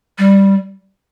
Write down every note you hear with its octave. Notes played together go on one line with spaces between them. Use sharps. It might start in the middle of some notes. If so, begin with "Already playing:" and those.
G3